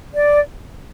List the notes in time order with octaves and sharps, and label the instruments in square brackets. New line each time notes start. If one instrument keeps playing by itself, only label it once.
[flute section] D5